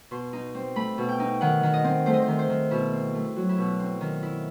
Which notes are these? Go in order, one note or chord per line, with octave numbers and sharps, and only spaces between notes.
B2 C6
D#4
C4
A3 B5
B2
G5
D#4
D#3 F#5
D#3
D#5
C4
A3 C5
D#5
C5
D#3
C5
D#3
B2 E4
C4
A3
F#3 F#4
E4
B2 F#4
C4
D#3
E4